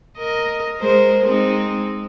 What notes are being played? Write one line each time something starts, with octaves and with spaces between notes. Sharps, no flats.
A#4 D#5
G#3 A#4 C5
G#3 C4 D#4